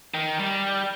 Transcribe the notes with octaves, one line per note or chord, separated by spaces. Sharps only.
D#3
G3